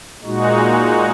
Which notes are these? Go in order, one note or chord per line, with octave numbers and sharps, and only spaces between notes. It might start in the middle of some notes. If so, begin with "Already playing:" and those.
A#2 G#3 D#4 F#4